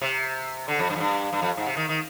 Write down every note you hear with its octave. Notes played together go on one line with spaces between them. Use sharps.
C3
D3
F2
G2
F2
G2
G2
F2
G#2
C3
D#3
D#3